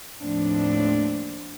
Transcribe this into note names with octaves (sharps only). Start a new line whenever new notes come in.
D#2 A2 F3 C4 D4